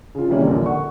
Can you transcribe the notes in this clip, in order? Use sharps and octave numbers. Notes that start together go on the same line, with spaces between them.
C#3 F4
C3 D#3 E3 G3 A#3 C#4
A#1 A#2 D3
F#5 C#6